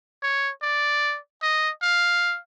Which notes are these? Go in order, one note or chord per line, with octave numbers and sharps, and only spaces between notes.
C#5
D5
D#5
F5